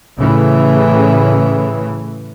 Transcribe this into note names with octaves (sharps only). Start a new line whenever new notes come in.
A2 C#3 E3